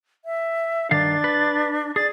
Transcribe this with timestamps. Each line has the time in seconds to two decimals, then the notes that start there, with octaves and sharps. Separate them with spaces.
0.25 E5
0.91 G2 D#3 D4 F5 A6
1.24 B4
1.96 G#4 D5 A6